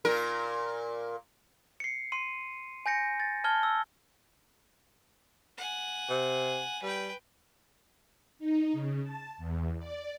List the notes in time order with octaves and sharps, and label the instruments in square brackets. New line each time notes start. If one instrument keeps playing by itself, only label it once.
[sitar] A#2 A#4
[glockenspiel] C7 C#7
C6 C7 D#7
G#5 G6 A#6 C#7
A6
A5 F6 G#6 G7
E6
[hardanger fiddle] F#5 G#5
[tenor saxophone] C3
[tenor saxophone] G3 [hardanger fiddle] B4 G5
[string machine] D#4
C#3
A5
E2
D5